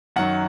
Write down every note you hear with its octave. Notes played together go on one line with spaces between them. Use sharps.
F#2 D#3 F#3 F#5